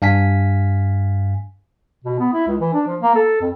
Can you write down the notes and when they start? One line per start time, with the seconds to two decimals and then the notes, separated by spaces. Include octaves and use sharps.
0.02 G2 F5 G#5 B6
2.04 B2
2.20 B3
2.34 E4
2.47 C#2
2.60 E3
2.73 D4
2.87 F3
3.01 A#3
3.15 A4
3.41 F2